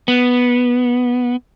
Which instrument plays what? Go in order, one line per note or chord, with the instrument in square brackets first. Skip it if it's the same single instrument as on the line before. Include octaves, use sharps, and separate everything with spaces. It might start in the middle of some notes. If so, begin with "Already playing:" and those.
[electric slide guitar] B3